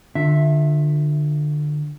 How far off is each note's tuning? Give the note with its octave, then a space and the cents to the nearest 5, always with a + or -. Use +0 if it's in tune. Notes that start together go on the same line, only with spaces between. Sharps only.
D3 +25 F4 +35 E5 +0